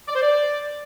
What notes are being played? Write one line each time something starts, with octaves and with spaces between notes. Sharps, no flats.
D5
C5
D5